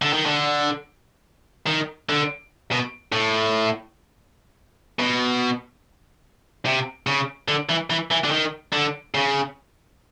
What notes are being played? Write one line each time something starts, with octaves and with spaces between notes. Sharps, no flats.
D3
D#3
D3
D#3
D3
B2
A2
B2
C3
C#3
D3
E3
E3
E3
D3
D#3
D3
C#3